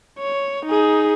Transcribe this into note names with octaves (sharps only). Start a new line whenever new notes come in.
C#5
D#4 G#4